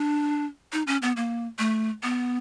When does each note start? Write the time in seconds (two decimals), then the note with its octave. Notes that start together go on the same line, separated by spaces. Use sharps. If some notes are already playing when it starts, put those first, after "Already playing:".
Already playing: D4
0.73 D#4
0.87 C#4
1.02 B3
1.16 A#3
1.59 A3
2.03 B3